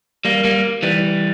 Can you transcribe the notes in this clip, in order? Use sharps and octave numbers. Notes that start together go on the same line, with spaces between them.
G3 A#3
G3 A#3
E3 G3